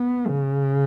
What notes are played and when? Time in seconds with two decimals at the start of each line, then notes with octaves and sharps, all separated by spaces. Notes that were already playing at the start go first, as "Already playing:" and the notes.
Already playing: B3
0.28 C#3